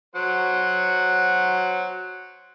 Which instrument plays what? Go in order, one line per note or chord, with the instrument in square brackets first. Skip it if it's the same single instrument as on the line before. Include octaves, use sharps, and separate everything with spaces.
[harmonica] F#3 C5 F#5